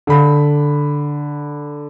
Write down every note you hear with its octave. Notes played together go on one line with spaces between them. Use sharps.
D3 B5